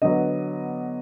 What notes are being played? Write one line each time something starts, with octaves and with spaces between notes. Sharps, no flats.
D3 F#3 B3 D#5